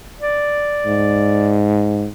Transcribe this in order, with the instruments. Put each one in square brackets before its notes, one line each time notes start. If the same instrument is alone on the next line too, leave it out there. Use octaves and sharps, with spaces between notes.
[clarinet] D5
[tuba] G#2